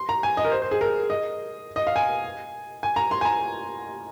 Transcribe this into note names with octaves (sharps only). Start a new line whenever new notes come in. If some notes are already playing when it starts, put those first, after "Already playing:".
Already playing: C6
A#5
G#5
D#5
A#4
C5
C5
G#4
A#4
D#5
D#5
F5
G#5
G#5
A#5
C6
G#5
A#5